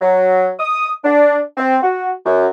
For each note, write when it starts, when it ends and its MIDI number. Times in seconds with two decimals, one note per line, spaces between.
0.01 0.49 54
0.59 0.91 87
1.04 1.39 62
1.57 1.77 60
1.83 2.10 66
2.25 2.47 42